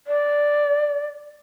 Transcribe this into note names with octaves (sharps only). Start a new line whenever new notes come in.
D5